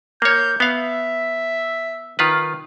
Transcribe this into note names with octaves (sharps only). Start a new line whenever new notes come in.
A#3 C#5 G6
B3 E5 F5
D#3 F4 B4